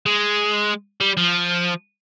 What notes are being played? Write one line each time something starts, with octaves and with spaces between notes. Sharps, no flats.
G#3
G3
F3